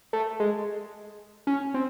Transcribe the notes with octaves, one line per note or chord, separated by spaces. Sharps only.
A3
G#3
C#4
C4